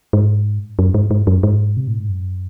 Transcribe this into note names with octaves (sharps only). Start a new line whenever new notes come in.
G#2
F#2
G#2
G#2
F#2
G#2
C3
A2
G#2
F#2